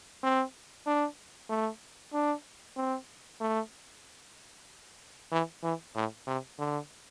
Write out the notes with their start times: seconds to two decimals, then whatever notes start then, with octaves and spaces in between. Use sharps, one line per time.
0.23 C4
0.87 D4
1.50 A3
2.14 D4
2.77 C4
3.41 A3
5.32 E3
5.63 E3
5.95 A2
6.27 C3
6.59 D3